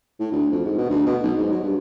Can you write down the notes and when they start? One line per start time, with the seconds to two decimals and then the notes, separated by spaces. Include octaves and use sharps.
0.20 A2
0.32 D2
0.52 F2
0.65 G#2
0.77 B2
0.90 D2
1.06 B2
1.23 B1
1.37 G#2
1.52 F#3
1.63 G2